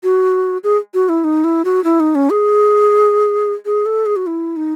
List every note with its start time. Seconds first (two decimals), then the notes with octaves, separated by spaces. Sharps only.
0.03 F#4
0.64 G#4
0.94 F#4
1.09 E4
1.24 D#4
1.44 E4
1.65 F#4
1.84 E4
2.00 D#4
2.15 C#4
2.30 G#4
3.66 G#4
3.86 A4
4.06 G#4
4.16 F#4
4.27 E4
4.56 D#4